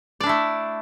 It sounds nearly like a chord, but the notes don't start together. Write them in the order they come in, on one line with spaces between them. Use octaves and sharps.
D5 D4 E4 A3